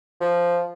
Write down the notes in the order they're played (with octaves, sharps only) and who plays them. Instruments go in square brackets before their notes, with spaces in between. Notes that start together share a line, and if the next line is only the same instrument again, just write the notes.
[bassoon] F3